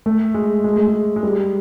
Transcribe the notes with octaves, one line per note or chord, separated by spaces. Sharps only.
A3
G#3
G#3
A3
G#3
G#3
G3